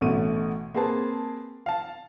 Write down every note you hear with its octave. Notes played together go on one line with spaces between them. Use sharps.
A1 B2 A3 D#7
A#3 C4 G#4 B4 A5
F5 A5